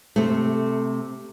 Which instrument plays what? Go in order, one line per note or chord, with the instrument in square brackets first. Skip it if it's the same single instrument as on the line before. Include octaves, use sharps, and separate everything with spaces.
[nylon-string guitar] C3 A3